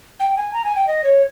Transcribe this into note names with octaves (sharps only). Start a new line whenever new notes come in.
G5
G#5
A#5
G#5
G5
D#5
C#5